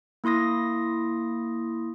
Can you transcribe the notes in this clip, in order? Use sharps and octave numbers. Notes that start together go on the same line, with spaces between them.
A#3 E4 C6 D#6 A#6